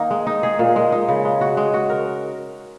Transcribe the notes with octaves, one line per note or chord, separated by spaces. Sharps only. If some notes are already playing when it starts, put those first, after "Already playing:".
Already playing: D#3 A#3 D#4
G#3
D#4
G#4
A#2
G#3
D#4
C#3
G#3
F#4
G#3
F#4
A#4